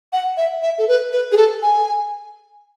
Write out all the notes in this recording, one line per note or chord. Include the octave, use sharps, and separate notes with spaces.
F#5
E5
E5
A4
B4
B4
G#4
A4
G#5